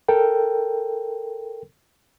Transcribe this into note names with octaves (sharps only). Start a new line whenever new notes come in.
A4 A#4 G5